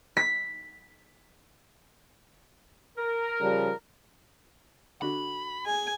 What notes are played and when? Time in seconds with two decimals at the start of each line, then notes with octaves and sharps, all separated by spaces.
0.17 B6
2.97 A#4
3.41 C#3 F3 G3
5.02 D3 F#4 B5
5.67 G#4 G#5